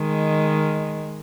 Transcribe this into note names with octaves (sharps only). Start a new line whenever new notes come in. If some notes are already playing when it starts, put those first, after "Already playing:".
Already playing: D#3 G#3